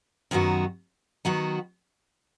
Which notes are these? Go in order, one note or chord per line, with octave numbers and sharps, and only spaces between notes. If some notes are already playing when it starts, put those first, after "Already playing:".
F#2 D#3 F#3 B3 F#4
D#3 F#3 B3 F#4